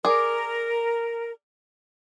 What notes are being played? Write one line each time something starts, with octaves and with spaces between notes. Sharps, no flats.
G#4 A#4 D5